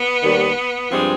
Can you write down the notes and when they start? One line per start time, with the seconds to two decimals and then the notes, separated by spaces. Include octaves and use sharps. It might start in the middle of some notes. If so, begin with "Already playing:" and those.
Already playing: B3
0.22 D#2 D#3 G3
0.90 G2 F3 G#3 C4